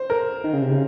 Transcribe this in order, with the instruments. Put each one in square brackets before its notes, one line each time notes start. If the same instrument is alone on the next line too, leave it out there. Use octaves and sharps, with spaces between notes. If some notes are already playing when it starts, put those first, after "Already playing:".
Already playing: [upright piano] C5
A#4
[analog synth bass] D#3
C#3
C3
C#3